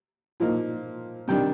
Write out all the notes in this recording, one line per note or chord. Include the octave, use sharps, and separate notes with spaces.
A#2 F3 A#3 D#4
C3 D#3 G3 D4 G5